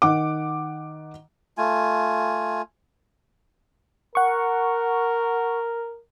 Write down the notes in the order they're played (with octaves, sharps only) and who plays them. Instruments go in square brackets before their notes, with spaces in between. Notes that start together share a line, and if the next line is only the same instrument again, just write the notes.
[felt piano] D#3 F#5 D6
[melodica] A3 F4 G#5
[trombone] A#4 [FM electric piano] F#5 C#6